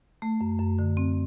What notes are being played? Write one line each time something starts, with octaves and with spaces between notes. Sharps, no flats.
A3
F#2
F#2
D3
C4